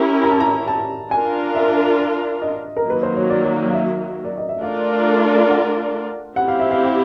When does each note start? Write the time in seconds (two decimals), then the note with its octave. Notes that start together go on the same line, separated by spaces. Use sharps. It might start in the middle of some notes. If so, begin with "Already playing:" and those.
Already playing: C#4 E4 G4 A#4
0.24 A#5
0.32 A5
0.40 A#5
0.68 A5
1.11 D4 F4 A#4 G#5
1.55 E5
2.42 D#5
2.77 A#4
2.86 D#3 F#3 A#3 B4
3.03 C5
3.16 C#5
3.30 D5
3.44 C#5
3.68 F5
3.74 E5
4.25 D5
4.37 D#5
4.49 E5
4.61 A3 D4 F4 A#4 D5 F5
5.49 F#5
6.36 C4 E4 G4 F#5
6.48 F5
6.60 E5
6.71 F5